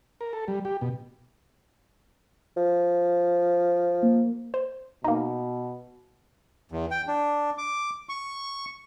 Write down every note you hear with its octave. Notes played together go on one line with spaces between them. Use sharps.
A#4
A4
G3
G4
B2
F3
A#3
C5
B2 A#3 D#4
E2
G5
D4
D6
C#6